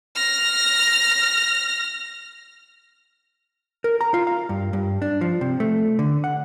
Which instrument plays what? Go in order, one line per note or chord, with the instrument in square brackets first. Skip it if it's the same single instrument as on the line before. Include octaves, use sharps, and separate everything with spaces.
[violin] F6 A#6
[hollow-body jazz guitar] A#4
A#5
F4
F5
G2
G2
D4
F3
C3
A3
D3
F#5